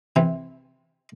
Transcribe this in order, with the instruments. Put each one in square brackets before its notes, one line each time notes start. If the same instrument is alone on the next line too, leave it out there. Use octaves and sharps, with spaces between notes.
[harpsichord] C3 E3 C4